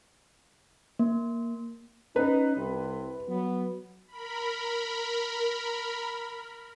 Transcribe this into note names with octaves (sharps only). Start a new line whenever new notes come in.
A#3
C#4 D#4 B4
C2 C3
F#3 B3
A#4 B5